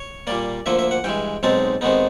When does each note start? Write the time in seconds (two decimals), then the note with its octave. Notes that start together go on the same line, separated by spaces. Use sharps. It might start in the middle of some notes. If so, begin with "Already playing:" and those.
Already playing: C#5
0.27 A#2 G3 A#3 D5
0.66 D2 D3 F3 A#3 E5
0.79 E5
0.91 F#5
1.04 G2 E3 G#3 G5
1.43 B1 B2 G#3 C4 D#4 A5
1.81 C3 D#3 G#3 B3 D#4